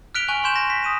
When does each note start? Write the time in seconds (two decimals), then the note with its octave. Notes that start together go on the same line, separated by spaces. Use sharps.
0.15 F6 F#6 B6 D7 F7 G7
0.28 G#5 C#6 F#6 F#7
0.44 C6 C#6 G6 E7 F#7
0.56 A#6
0.70 B6
0.83 D#6 D#7 E7